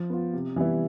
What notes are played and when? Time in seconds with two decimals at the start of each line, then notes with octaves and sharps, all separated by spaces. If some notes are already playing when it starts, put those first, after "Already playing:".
Already playing: F3
0.10 B3 F4
0.33 C3
0.56 E3 G3 B3 E4